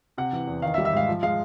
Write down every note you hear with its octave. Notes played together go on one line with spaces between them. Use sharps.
C3 F#5
E3
E2
D#3 F5
E5
G3
E5
G#2 F5
F3
G#3 F5